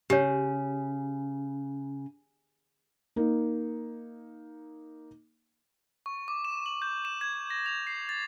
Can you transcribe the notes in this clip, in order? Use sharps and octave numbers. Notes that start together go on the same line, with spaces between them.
C#3 G4 C#5
A#3 D#4
C#6
D6
E7
F#7
G6
E7
G#6
A#6
F7
C7
A6